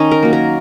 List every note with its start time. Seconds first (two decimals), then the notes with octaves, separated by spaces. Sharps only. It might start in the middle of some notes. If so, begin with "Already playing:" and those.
Already playing: D#3 C#4 D#4
0.11 A#4
0.23 F#3 A#3
0.33 A#4